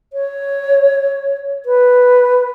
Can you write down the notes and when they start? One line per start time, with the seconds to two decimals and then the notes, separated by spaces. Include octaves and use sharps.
0.13 C#5
1.65 B4